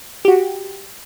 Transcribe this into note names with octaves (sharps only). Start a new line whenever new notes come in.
F#4 G4